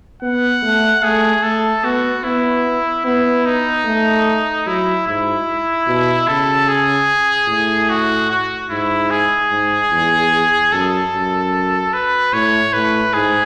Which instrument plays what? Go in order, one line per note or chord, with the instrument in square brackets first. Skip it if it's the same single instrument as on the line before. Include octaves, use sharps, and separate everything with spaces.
[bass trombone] B3 [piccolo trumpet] F#5
[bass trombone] A3
[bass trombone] A3 [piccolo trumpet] G#4
[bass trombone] A3 [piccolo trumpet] A4
[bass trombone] B3 [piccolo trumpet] F#4
[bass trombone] B3 [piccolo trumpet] E4
[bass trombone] B3 [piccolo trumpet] E4
[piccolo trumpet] D#4
[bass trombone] A3
[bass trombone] F#3 [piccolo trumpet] E4
[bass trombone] G#2 [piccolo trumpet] E4
[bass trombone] B2
[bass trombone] C#3 [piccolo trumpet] A4
[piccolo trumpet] G#4
[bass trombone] A2
[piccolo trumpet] F#4
F#4
[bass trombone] G#2 [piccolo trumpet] E4
[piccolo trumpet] G#4
[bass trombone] G#2
E2
[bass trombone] F#2 [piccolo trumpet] A4
[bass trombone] F#2
[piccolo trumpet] B4
[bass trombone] A2 [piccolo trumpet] C#5
[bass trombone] A2 [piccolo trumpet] B4
[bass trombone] G#2 [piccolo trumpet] G#4